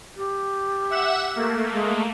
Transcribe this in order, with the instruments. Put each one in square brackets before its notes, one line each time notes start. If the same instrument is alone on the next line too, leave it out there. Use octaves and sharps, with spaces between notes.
[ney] G4
[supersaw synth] E5 F#5 E7
A3 A#3
[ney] G#3